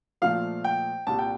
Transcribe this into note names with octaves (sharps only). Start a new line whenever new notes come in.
A#2 F3 A3 F5
G5
C2 A#2 G3 A5
G5